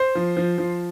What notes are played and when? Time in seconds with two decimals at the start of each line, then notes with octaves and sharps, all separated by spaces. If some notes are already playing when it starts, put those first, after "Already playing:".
Already playing: C5
0.15 F3
0.37 F3
0.58 F3